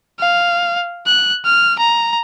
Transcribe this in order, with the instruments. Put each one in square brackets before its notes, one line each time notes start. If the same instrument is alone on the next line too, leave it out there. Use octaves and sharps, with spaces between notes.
[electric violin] F5
F#6
F6
A#5